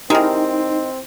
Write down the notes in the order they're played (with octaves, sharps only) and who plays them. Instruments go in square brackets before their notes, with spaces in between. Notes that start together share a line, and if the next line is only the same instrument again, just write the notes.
[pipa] D#3 G#3 [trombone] C4 [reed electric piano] D#4 [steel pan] E4 G4 A#4